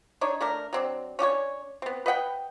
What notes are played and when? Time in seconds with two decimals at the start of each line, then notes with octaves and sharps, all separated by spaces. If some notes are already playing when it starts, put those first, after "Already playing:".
0.21 D4 D#4 C#5
0.41 A3 D4 A#4
0.73 F#3 C4 D4
1.19 C#4 D4 G4 C#5
1.82 B3 C4
2.06 B4 D#5 F#5 G5